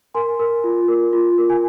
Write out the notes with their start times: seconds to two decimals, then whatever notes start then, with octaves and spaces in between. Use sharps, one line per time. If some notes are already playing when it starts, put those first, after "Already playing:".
0.14 A#4 G#5 C6
0.40 A#4
0.64 F4
0.88 A#4
1.13 F4
1.38 A#4
1.50 G#5